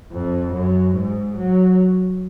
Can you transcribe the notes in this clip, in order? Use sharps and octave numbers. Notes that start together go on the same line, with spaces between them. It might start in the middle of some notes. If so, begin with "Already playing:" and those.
F2
F#2
G#2
F#3